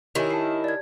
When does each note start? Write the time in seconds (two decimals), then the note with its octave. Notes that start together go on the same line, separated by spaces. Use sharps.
0.15 D#3 E4 G4 C#5 G#5
0.31 A5 C7
0.64 D5 G#6